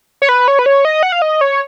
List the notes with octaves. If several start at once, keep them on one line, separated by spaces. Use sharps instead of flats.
C#5
B4
C#5
B4
C#5
D#5
F#5
F5
D#5
C#5